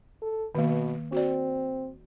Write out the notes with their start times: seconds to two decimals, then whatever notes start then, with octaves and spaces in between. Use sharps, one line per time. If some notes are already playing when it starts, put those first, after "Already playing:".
0.22 A4
0.55 B2 D#3 A#3
1.12 C4 F#4 D5